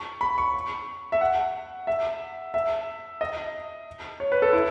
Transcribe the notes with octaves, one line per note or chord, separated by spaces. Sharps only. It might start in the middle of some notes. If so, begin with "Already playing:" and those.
Already playing: C#6
B5
C#6
E5
F#5
E5
E5
D#5
C#5
B4
A4
E4